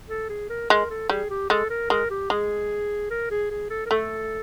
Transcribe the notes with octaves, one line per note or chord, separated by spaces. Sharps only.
A4
G#4
A#4
G#3 A#4
A4
G3 G#4
G4
G#3 A4
A#4
G#3 A#4
G4
G#3 G#4
A#4
G#4
G#4
A4
A#4
A3 A4